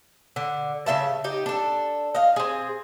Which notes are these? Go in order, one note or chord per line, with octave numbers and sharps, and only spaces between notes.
D3
C#3 A3 E5 A5
D#4 G4
D4 A4
D#5 F5
C4 G#4